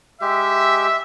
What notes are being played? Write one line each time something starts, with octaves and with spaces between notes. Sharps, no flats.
G#3 G4 E5